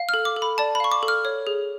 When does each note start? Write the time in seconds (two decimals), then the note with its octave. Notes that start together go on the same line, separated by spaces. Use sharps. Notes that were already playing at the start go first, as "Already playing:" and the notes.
Already playing: F5
0.09 A4 F6
0.25 D6
0.36 A4
0.42 B5
0.58 D5 A5
0.75 B5
0.80 F5 C#6
0.92 D6
1.03 A4
1.08 F6
1.25 C#5
1.47 G#4